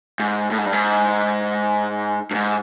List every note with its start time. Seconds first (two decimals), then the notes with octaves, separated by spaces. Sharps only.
0.20 G#2
0.51 A2
0.58 G#2
0.65 G2
0.73 G#2
2.31 G2
2.35 G#2